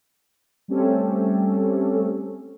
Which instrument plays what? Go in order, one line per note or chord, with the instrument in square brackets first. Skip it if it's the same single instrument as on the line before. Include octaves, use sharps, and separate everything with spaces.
[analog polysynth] G3 A3 C4 C#4 G4 A4